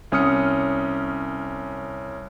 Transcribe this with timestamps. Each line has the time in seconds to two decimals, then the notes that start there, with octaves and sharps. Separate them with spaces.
0.12 C2 C#4 D#6 F6 C#7